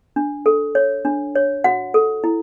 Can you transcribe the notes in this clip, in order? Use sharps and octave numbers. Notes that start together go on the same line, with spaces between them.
D4
A4
C#5
D4
C#5
F#4 F#5
A4
E4